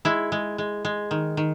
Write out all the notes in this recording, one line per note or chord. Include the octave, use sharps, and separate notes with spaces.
G#3 E4
G#3
G#3
G#3
D#3
D#3